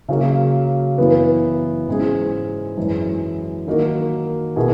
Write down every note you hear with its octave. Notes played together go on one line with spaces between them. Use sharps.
C#3 F#3 A#3
F#2 E3 B3
G#2 E3 G#3 C#4 G#4
F#2 E3 G#3
D#3 A#3 D#4 F#4 A#4
B2 A#3 E4 G#4